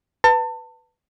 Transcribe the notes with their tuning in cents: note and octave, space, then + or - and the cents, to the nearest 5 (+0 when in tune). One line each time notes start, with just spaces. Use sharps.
B4 +0 A5 +30